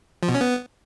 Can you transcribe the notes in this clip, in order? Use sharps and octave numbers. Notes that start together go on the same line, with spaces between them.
F3
B2
C#4
B3